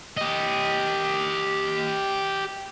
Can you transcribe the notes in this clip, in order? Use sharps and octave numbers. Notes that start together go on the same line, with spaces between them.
G4 D#5